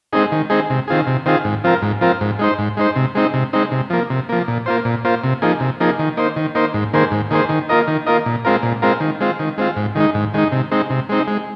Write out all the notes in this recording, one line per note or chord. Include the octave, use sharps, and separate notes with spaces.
G#3 C4 D#4 G#4
D#3
G#3 C4 D#4 G#4
C3
D#3 C4 F4 G#4
C3
D#3 C4 F4 G#4
G#2
F3 C4 F4 A#4
G#2
F3 C4 F4 A#4
G#2
G#3 D#4 C5
G#2
G#3 D#4 C5
C3
G#3 C4 D#4
C3
G#3 C4 D#4
C3
F3 A#3
C3
F3 A#3
A#2
A#3 F4 C5
A#2
A#3 F4 C5
C3
F3 A#3 D#4 G#4
C3
F3 A#3 D#4 G#4
D#3
A#3 D#4 C5
D#3
A#3 D#4 C5
G#2
D#3 A#3 G#4 C5
G#2
D#3 A#3 G#4 C5
D#3
A#3 F4 A#4 D#5
D#3
A#3 F4 A#4 D#5
A#2
G#3 C4 F4 A#4
A#2
G#3 C4 F4 A#4
D#3
G#3 C4 F4
D#3
G#3 C4 F4
G#2
D#3 G#3 D#4
G#2
D#3 G#3 D#4
C3
G#3 C4 D#4
C3
G#3 C4 D#4
G#3